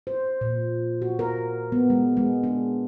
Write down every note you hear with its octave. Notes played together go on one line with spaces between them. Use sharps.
C5
A#2
F#4
A#4
B3
G#3
G#3
D4